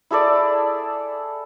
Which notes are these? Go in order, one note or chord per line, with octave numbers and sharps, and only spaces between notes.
E4 G#4 A4 D5